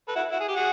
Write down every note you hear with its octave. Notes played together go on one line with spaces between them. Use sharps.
A4 B4
E4 F#4
E4 F#4
G#4
G4
F#4 G#4